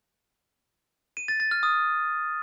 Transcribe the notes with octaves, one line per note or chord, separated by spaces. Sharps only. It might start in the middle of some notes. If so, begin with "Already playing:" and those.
D#7
A6
A6
F6
D#6